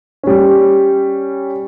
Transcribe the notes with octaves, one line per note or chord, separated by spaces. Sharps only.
G3 C#4